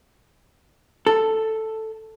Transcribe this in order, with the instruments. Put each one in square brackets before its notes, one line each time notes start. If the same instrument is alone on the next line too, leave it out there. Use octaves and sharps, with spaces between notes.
[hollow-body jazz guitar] A4